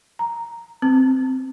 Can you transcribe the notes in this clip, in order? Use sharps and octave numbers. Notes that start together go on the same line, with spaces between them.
A#5
C4